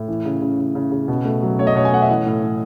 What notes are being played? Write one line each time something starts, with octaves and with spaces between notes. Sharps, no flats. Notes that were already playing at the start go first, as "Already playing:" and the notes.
Already playing: A2
E3
C#3
C#3
C#3
C#3
C#3
B2
A3
F#3
A3 C#5
D#5
B2 C#5
G#5
A3 F#5
E5
E3 D#5
A2
E3